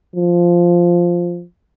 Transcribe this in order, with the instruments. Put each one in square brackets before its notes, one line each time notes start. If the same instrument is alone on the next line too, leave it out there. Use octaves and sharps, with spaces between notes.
[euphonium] F3